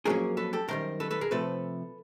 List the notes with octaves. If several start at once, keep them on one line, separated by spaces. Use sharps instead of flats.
F2 D3 F#3 A#3 C#4 G#4 A#4
A4 B4
G4 A4
F#2 D#3 G3 A#4 C5
A4 B4
A4 B4
G#4 A#4
C3 F3 A3 C4 A4 B4